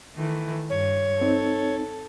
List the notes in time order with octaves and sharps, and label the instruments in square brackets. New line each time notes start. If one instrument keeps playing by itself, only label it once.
[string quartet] D#3 E3 A3
[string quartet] G2 [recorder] C#5
[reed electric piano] C4 D#4 [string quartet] A4